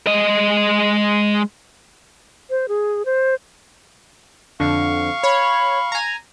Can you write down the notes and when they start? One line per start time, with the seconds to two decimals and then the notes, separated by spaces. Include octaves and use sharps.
0.07 G#3 D#5
2.50 C5
2.68 G#4
3.06 C5
4.60 F2 D3 F5 C#6
5.23 C#5 B5
5.92 G#5 A#5